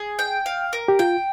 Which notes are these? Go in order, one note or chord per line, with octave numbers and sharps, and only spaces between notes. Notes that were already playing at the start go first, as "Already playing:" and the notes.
Already playing: G#4
G5
F5
A#4
G4
F4 G5